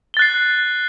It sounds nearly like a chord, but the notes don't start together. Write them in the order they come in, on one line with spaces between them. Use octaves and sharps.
G7 A6 F#6 C7